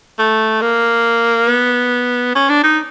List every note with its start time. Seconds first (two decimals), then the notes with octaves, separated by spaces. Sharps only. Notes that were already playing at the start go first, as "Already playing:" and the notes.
0.19 A3
0.62 A#3
1.49 B3
2.35 C#4
2.49 D4
2.64 D#4